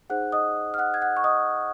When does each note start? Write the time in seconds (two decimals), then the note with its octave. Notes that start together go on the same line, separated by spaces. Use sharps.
0.10 D#4 G#4 C5 F#5 F#6
0.32 D#5 D#6
0.74 F6
0.78 F#5 F#6
0.94 G#6
1.02 F#5 F#6
1.17 C#6
1.24 D#5 D#6